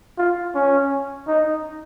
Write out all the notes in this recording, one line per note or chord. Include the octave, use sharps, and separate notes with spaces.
F4
C#4
D#4